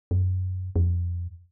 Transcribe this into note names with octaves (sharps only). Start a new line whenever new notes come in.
F#2
F2